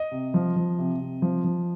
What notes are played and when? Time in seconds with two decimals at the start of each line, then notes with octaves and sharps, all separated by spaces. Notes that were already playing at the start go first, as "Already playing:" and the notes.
Already playing: D#5
0.12 C3
0.34 F3
0.56 F3
0.79 C3
1.00 C3
1.22 F3
1.44 F3